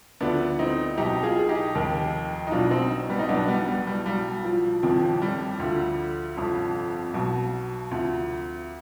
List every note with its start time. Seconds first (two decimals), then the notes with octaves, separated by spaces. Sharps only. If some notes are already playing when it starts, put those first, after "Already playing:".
0.21 D2 D3 F3 B3 D4
0.59 C4 D#4
0.98 B1 B2 D#4 G4
1.23 F4 G#4
1.39 G#4
1.49 D#4 G4
1.75 F1 D#2 D#3
2.47 D#4
2.51 B1 B2 D4 F4
2.71 C4 D#4
3.10 G3 B3
3.19 D#4
3.29 B1 B2 B3 D4
3.48 G3 B3
3.68 G3
3.87 G3
4.06 B1 B2 G3
4.44 F3
4.83 G1 F2 C3 D#3 F3
5.22 G3
5.60 D2 D3 F3
6.37 G1 F2 C3 F3
7.14 B1 B2
7.91 D2 C3 F3